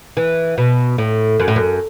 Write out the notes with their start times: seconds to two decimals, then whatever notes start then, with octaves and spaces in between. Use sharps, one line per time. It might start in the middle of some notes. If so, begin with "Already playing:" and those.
0.17 E3
0.58 B2
0.98 A2
1.40 F#2
1.48 A2
1.56 F#2